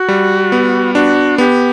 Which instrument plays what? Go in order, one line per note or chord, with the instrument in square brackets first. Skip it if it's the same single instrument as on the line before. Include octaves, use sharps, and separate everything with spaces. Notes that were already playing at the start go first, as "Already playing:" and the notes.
Already playing: [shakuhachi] F#4
[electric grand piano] G3
B3
[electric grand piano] D4 [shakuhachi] F#4
[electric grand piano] B3 [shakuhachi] G4